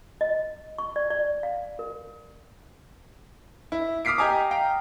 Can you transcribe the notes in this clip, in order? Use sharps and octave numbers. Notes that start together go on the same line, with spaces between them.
D#5
C#6
D5
D5
F5
A#4
E4
D6 D#6 F6 B6 C7 D7
G4 D#5 G#5 A#5 D6
F5 G5 A#5